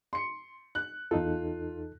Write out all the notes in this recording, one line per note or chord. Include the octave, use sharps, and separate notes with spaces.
C6 C#7
F#6
E2 D#4 F4 A4